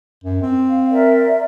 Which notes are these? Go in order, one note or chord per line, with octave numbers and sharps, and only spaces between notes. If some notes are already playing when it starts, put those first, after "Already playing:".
F#2
C4
F5
A#4 D5 E5